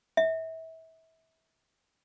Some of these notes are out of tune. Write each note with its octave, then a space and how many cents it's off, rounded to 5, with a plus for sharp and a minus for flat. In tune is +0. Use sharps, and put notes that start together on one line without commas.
E5 -30